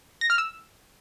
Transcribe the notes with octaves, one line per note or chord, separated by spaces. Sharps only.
A#6
F6
E6